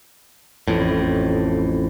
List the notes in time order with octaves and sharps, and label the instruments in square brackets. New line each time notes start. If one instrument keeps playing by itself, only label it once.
[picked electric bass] A1 F2 A2